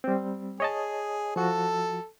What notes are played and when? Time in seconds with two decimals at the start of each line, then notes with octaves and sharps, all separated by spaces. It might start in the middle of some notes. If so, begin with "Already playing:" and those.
0.04 G3 C4
0.60 G#4 C#5 D#5 A5
1.36 F3 F#4 A4